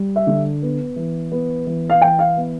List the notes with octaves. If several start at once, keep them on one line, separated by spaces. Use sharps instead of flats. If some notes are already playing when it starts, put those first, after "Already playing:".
Already playing: G3
E5
D3
B3
E3
B3
E3
F5
E3 G5
F5
B3